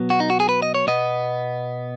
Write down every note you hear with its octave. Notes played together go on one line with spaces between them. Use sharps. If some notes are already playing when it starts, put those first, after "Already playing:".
Already playing: B2 F#3 B3
F#4
D#4
F#4
G#4
B4
D#5
C#5
B2 B3 D#5